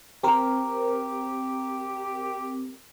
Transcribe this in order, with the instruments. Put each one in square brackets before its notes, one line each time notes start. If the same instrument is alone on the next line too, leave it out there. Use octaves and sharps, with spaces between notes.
[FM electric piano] C4 A#4 [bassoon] G4